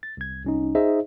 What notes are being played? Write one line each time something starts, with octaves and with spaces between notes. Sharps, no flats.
A6
C2 G#6
C2 C#4 D#4
D#4 G#4 C5 D#5 E5